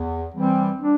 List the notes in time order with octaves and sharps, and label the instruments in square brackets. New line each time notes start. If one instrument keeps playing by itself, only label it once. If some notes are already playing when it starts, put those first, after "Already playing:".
Already playing: [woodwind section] E2
[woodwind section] E3 G3 [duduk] C4
[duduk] D4